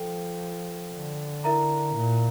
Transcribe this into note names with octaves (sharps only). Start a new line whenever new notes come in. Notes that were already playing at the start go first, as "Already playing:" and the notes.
Already playing: F3 A4 G5
D3
E4 A#4 E5 A#5
A#2